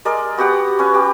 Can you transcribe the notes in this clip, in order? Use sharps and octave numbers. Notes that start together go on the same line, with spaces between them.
G#3 A#4 D5
B3 F#4 G4 F#5
C#4 B4
G4 D6